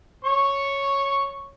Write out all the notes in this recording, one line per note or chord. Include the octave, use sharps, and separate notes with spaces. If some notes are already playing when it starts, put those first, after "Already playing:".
C#5 C#6